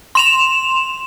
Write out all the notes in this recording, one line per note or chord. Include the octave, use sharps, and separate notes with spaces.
C6 E7 F7